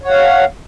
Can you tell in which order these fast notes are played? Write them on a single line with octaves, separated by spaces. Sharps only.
C#5 F#5 F5